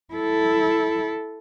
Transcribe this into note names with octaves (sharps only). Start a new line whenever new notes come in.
E4 A4